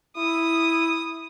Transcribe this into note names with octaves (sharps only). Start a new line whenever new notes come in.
E4 D#6